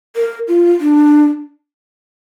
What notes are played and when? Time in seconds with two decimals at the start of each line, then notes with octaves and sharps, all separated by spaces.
0.16 A#4
0.48 F4
0.81 D4